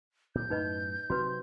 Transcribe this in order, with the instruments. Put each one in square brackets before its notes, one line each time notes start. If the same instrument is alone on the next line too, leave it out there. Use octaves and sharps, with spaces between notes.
[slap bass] A#2 F#3 [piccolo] G6
[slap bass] F#2 A2 [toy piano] D#4 B4 D#5
[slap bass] C3 F#3 C4 [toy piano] F#4 B4